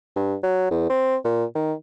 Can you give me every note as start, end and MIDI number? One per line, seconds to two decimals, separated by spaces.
0.16 0.35 43
0.43 0.71 54
0.71 0.89 40
0.89 1.16 60
1.25 1.45 46
1.55 1.73 51